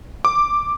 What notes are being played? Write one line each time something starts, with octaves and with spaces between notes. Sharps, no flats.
D6